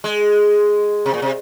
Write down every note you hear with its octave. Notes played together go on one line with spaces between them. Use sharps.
G#3
C3
A#2
C3